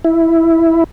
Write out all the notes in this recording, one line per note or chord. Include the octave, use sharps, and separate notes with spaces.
E4